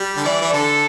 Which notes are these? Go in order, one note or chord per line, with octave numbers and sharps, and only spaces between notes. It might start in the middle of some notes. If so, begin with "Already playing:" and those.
Already playing: G3
D3
E3 D5
E3
D3 A4